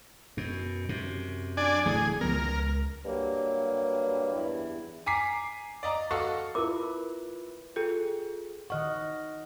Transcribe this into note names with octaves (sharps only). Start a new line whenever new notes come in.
F#2 B2
F#2 C3
D4 D5 G#5
D1 E3 A3 G#4
C#2 F3 B3 A#4
C#2
G2 F#3 A#3
E2 E4
G#5 A#5 D6 B6 C7
D5 D#5 A#5
F#4 A4 D#5 F5 A5 C#6
E4 F4 A#4 B4 E5 D6
F4 G#4 A4 G5
D#3 D#5 F#5 C#6 F6